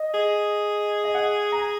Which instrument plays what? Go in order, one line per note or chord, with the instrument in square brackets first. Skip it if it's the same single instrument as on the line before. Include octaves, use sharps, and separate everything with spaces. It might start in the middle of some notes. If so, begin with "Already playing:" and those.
Already playing: [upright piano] D#5
[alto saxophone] G#4
[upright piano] D#5
F#5
A#5